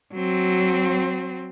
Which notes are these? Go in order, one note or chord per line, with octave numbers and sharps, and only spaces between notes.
F#3 C4